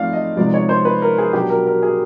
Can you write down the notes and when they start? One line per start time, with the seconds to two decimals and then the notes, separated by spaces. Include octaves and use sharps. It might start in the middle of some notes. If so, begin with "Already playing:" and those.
Already playing: F3 A3 C4 D#4 D5 F5
0.13 D#5
0.37 C3 F3 G#3 B3 D#4 D5
0.54 C#5
0.69 C5
0.85 B4
1.02 A#4
1.18 G#4
1.33 B2 F#3 B3 D4 G4
1.50 A#4
1.66 A#4
1.83 G#4